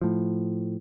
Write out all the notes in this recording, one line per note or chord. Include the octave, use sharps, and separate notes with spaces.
A2 F3